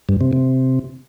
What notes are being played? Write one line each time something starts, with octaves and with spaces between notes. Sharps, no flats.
G2
C3
C3